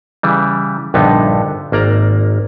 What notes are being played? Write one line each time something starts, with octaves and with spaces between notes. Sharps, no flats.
C#3 E3 G3
A#1 G2 D3 B3 D#4
G#1 A#3 D5 A#5